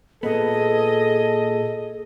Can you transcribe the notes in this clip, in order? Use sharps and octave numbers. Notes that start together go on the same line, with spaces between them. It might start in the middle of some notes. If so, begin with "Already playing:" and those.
A#2 B3 G#4 A4 D#5